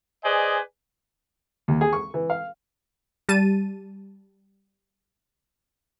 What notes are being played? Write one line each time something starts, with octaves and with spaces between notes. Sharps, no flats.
G#4 B4 C5 D5 D#5 G#5
D#2
G#4
C#6
E3
F5
G3 A5 D#7